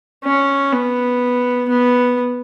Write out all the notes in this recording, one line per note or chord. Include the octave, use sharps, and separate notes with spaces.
C#4
B3
B3